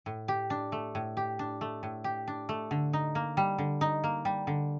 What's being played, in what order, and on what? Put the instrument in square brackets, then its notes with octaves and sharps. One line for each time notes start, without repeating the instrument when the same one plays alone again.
[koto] A2
G4
D4
A3
A2
G4
D4
A3
A2
G4
D4
A3
D3
D#4
A#3
G3
D3
D#4
A#3
G3
D3